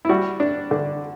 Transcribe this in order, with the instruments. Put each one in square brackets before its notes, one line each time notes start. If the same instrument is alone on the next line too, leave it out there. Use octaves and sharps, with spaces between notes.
[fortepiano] E4
G3 F#4
D4
D3